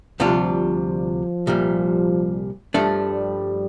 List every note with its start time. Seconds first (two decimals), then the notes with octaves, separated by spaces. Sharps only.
0.20 D2 C3 F3 G3 D4 F4
1.47 C2 A#2 G3
2.74 G2 F3 G3 A3 D4